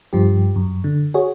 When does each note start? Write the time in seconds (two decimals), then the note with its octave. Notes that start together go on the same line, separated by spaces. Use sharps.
0.13 G2 F3 G4
0.56 F#2
0.84 D3
1.14 F#4 G#4 C#5